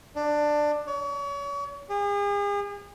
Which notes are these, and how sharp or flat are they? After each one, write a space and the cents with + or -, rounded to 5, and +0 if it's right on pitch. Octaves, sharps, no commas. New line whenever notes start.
D4 +15
C#5 +35
G#4 -40